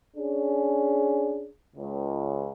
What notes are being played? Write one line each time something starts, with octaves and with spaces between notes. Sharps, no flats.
C#4 D4 G#4
C#2